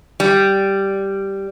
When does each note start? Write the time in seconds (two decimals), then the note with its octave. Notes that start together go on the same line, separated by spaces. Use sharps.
0.20 G3